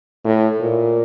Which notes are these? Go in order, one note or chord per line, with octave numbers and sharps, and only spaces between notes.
A2
A#2